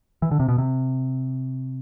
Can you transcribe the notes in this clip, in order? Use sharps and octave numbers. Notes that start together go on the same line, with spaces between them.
E3
D3
C3
B2
C3